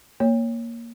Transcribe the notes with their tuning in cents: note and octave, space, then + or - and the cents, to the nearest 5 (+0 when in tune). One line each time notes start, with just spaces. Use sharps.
A#3 +0 C#5 +0